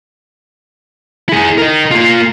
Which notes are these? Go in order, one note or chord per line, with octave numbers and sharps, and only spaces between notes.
E4 G#4
A#4 D#5
A#3 F4